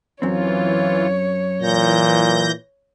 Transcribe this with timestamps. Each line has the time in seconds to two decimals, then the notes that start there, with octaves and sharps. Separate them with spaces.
0.22 F#2 E3 C4 F4 C#5
1.62 A#2 E3 G6 A#6